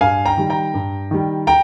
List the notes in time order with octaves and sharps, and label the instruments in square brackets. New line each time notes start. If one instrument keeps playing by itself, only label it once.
[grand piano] G2 F5 G#5
G5 A#5
D#3 G3
G5 A#5
G2
D#3 G3
G5 A#5